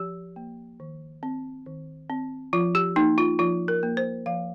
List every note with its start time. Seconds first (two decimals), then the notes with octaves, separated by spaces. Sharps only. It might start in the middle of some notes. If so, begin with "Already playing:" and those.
Already playing: F3 G4
0.36 A#3
0.80 D#3
1.23 C4
1.66 D#3
2.10 C4
2.53 F3 F4
2.75 G4
2.96 A#3 D#4
3.18 F4
3.39 F3 F4
3.68 A#4
3.83 A#3
3.97 C5
4.26 F3 F5